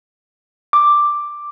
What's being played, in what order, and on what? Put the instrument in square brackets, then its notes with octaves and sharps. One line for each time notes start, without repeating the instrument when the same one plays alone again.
[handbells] D6